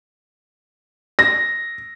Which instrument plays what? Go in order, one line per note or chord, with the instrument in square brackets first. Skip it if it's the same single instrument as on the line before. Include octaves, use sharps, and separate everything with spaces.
[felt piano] A#6